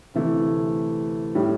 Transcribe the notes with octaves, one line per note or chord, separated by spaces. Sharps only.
D2 C3 E3 A3
A2 G3